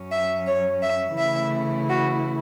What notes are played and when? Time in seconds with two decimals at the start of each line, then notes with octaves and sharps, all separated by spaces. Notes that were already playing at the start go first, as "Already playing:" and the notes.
Already playing: F#2 F#3 C#4
0.11 E5
0.47 C#5
0.82 E5
1.18 C#3 E3 A3 E4 E5
1.89 F#4